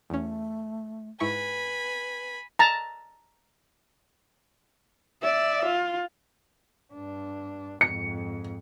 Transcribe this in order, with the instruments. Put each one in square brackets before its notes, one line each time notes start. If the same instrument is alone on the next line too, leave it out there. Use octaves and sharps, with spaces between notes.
[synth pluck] E2 C#4 [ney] A3
[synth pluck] G#2 E4 C#6 [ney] B4 [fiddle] G#5 B5
[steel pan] A5 A#5
[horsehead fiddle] D5 E5
F4
[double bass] G2 D4
[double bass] F2 G#2 [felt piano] C#7